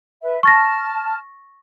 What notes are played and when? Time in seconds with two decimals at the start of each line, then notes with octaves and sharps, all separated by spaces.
0.22 B4 E5
0.43 A5 C#6 F6 A6 A#6